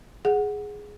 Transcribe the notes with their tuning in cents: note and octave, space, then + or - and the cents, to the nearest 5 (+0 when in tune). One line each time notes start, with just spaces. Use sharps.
G#4 +0 F#5 -5